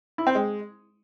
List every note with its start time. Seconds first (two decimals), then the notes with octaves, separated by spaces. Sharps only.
0.18 E4
0.27 C4
0.35 G#3